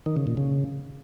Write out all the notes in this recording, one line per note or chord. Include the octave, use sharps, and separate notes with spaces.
D#3
C#3
A#2
C#3